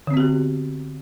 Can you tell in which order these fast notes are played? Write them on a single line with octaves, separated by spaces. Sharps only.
D3 C4 B3 F#4 G4